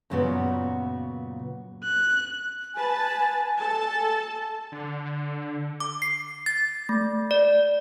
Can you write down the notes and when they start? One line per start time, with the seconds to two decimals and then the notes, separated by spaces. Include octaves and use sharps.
0.10 F#2 A#2 C#3 F#3 B3 F#4
1.84 F#6
2.75 B4 G#5 A5
3.58 A4 A5
4.72 D3
5.80 D6
6.02 C7
6.46 A6
6.89 A3
7.31 D5